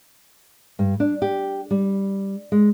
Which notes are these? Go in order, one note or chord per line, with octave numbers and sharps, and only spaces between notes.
G2
D4
G4
G3
G#3